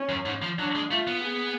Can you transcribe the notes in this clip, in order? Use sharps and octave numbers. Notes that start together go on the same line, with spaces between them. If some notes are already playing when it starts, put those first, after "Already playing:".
Already playing: C#4
F#2
G#2
F3
F#3 D4
G#3
A3 F4
B3
G#4